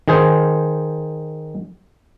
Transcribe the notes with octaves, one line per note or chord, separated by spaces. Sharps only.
D#3 G#4 C5